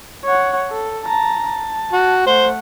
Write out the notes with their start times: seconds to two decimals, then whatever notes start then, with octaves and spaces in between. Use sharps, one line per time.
0.25 C#5 F#5
0.71 A4
1.05 A5 A#5
1.47 A5
1.92 F#4
2.27 A3 C5 F#5